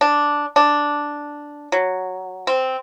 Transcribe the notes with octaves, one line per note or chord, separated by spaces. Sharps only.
D4
D4
F#3
C4